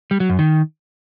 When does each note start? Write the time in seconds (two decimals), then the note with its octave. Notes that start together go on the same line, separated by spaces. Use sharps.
0.11 G3
0.20 F#3
0.30 F#2
0.39 D#3